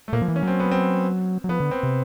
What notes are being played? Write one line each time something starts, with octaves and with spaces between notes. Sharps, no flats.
A3
A#2 A#3
F3
E3
C#4
F#3 C4
B3
C4
F#3
F3 B3
D3
C4
C3